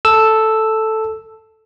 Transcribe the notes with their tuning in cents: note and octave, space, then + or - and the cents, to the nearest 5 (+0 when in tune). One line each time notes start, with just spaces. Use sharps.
A4 +0 E6 +0